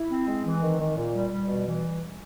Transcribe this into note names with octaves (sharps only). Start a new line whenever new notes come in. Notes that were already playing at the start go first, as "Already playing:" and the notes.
Already playing: E4
C4
G#3
E3
D#3
D#3
A#2
G3
G3
B2
E3